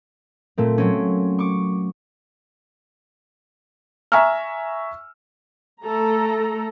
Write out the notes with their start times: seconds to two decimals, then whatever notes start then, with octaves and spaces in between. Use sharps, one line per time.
0.58 A#2 A3 C4
0.78 F#3 C4 C#4
1.39 C#6 D6
4.12 E5 G#5 A#5 C#6 E6 F6
5.83 A3 A4 A#5